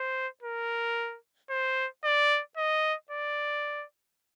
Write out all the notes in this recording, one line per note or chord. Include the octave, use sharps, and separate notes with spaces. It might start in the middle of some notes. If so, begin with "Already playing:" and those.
Already playing: C5
A#4
C5
D5
D#5
D5